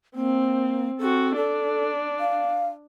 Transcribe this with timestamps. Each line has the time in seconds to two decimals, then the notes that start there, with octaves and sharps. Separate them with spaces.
0.15 A#3 C4
0.99 C4 F#4 A4
1.36 D4 A4
2.20 F5